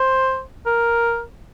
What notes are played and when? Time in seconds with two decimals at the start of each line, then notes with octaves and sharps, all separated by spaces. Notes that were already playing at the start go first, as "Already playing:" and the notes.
Already playing: C5
0.66 A#4